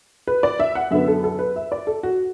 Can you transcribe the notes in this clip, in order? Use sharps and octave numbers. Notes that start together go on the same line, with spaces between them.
B4
D5
E5
F#5
F#2 D3 B3 E5
A4
A4
B4
E5
D5
A4
F#4